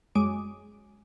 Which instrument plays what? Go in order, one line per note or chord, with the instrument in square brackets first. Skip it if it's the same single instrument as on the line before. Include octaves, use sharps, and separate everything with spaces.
[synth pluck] F#2 G#3 D6 D7